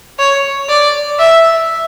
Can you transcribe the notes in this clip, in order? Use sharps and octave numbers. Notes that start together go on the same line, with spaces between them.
C#5
D5
E5